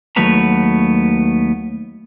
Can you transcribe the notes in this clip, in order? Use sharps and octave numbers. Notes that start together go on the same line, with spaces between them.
D#2 F#3 A3 B3 B4 A#5